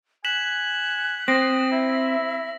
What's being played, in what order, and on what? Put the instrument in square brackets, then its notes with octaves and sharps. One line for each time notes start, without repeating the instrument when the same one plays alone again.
[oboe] G#5 [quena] F#6 [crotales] B6 E7 F#7
[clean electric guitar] C4 [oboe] D#6 [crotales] A#6
[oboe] E4 [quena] E5